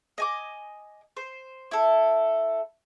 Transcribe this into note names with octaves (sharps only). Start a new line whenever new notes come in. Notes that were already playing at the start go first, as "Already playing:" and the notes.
D#5 G#5 D6
C5
E4 A4